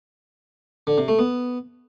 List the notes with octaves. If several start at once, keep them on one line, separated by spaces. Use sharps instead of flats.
D3
C3
A3
B3